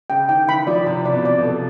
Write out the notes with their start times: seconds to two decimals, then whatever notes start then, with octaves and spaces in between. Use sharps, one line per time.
0.10 C#3 G5
0.29 D#3 G5
0.49 E3 B5
0.67 F3 D5
0.86 C3 B5
1.05 D5
1.13 B2
1.25 D5
1.38 B2
1.44 A4